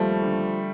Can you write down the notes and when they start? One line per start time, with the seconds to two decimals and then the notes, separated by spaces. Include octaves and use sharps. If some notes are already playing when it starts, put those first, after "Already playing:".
Already playing: D#2 F3 G3 A3
0.22 D3